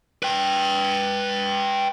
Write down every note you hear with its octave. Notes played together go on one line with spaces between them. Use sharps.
B4 G5